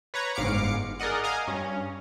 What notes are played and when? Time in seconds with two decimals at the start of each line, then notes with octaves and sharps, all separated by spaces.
0.14 B4 C#5 A#5
0.35 G1 G#2 F5 D6 C#7
0.99 G#4 A#4 D5 D#5 F#5
1.24 D#5 F5 G#5 A#5
1.47 G2 C#4